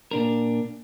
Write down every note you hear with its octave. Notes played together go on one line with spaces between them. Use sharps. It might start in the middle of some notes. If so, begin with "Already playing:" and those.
A#2 D4 A#4